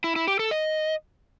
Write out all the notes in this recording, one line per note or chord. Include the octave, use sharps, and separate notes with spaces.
E4
E4
G4
A4
D#5